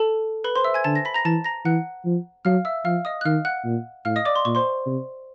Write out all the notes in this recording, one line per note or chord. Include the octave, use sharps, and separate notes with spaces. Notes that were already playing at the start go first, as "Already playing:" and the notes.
Already playing: A4 A5
B4 B5
C5 C6
E5 E6
G#5 G#6
D3 A5 A6
A#6
B5 B6
A#5 A#6
E3 A5 A6
A#5 A#6
E3 F#5 F#6
F3
F#3 F5 F6
E5 E6
F3 F5 F6
D#5 D#6
F#6
D#3 F5 F6
F#5 F#6
A#2
A2 F5 F6
D#5 D#6
D5 D6
C6
A#2 C#6
C5 C6
C3